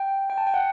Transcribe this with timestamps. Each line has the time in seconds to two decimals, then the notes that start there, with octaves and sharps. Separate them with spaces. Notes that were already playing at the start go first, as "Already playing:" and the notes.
Already playing: G5
0.30 G5
0.38 A5
0.47 G5
0.54 F#5